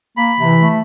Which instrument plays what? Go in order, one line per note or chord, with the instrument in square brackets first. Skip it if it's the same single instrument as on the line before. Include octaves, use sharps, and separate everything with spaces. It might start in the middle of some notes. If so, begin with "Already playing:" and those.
[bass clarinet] A#3 [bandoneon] B5
[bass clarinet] C3 [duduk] E3
[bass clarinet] A3